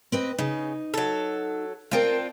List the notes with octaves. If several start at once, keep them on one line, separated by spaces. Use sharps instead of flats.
C4 B4 D#5
C#3 D#4
F#3 A4
C4 D4 F4 A#4 G5 A5